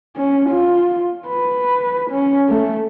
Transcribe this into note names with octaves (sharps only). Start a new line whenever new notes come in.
C#4
F4
B4
C#4
A3